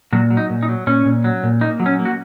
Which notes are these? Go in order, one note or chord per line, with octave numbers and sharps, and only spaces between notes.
A#2 F#3 F#4
F#3
D#4
A#2
D#4
F#3
A#2 C#4
A#2
F#3
A#2
A#3 D#4
F#3
C#4
A#3
F#4